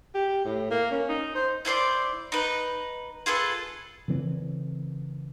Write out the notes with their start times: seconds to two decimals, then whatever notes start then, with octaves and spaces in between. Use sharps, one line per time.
0.14 G4
0.45 A2
0.70 A#3
0.91 C#4
1.09 D#4
1.35 C5
1.65 E4 A4 C5 D5
2.32 D#4 B4
3.26 F4 G#4 A4 B4
4.08 C#3 E3 C4